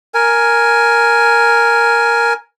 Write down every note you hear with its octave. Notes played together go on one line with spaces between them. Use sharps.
A#4 G#5